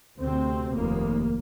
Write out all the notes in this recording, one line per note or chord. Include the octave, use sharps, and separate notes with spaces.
D2 C3 C4
F1 D#2 A#3